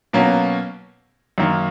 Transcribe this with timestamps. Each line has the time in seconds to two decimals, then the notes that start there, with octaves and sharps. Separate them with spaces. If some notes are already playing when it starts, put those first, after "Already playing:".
0.13 B2 F#3 A#3 C#4
1.38 F#2 D#3 A#3